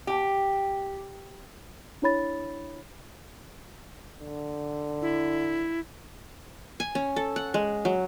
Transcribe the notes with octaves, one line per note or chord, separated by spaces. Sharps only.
G4
D4 E4 C#5 B5 A6
D3
E4
G#5
C#4
A4
F#5
G#3
F#3